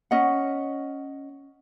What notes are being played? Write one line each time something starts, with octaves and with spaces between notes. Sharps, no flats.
C#4 D#5 F#5